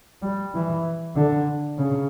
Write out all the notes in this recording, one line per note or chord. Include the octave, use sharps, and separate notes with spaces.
G3
E3
D3
C#3